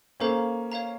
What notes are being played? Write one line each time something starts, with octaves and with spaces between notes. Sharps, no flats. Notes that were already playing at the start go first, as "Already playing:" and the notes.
A#3 C#4 A4 C5 F5 A#5
C#5 F5 A#5